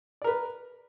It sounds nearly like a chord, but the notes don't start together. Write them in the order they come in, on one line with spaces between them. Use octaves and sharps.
D5 A#4 B4